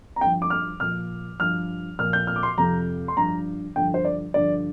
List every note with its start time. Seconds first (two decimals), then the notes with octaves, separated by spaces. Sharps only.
0.16 A#5
0.21 G2 G5
0.25 F3
0.42 D6
0.50 F6
0.80 A#2 F3 F6
1.40 G2 F3 F6
1.99 A#2 F3 F6
2.13 G6
2.27 F6
2.36 D6
2.43 C6
2.58 F2 C3 F3 A#5
3.08 C6
3.17 G2 F3 A#5
3.76 G2 D3 F3 G5
3.94 C5
4.05 D5
4.34 G2 D3 F3 D5